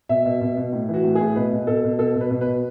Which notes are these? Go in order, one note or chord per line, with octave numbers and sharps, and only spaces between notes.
B2 E5
B2
B2
B2
A2
E3 F#4
A2
G#4
A2
B2 B4
B2
B2 A4
B2
B2 A4
B2 B4
B2
B4
B2